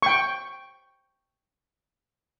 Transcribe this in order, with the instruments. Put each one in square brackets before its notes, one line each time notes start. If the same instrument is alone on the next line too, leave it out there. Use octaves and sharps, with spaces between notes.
[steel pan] G5 C#6